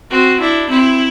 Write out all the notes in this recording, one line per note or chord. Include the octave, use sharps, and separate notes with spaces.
C4 F#4
D4 E4
C4 E4